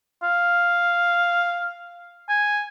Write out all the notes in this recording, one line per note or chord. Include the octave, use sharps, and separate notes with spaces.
F5
G#5